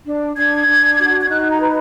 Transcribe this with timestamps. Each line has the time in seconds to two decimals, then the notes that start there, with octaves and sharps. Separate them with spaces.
0.05 D4
0.36 D4 G#6
0.67 D4
0.99 F#4
1.21 G#6
1.29 D#4 F#6
1.51 A#5
1.60 B4